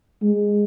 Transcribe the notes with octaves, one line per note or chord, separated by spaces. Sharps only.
G#3